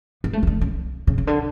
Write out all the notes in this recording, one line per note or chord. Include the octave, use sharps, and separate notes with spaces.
B3
A3
E3
D3
C#3
C#3
C#3
D3